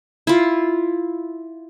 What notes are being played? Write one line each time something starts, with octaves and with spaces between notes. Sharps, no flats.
E4 F4